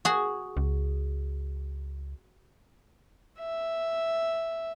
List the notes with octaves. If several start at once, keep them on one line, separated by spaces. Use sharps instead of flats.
F#4 G#4
C#2
E5